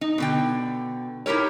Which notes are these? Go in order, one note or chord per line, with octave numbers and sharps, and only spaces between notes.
D#4
B2 D3 G5
D#4 E4 G4 A#4 C#5